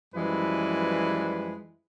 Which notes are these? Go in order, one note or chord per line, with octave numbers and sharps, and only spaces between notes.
F#2 E3 F3 G3 G#3 B4